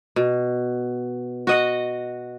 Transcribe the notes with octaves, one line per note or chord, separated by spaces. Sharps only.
B2
F#4 D#5 F#5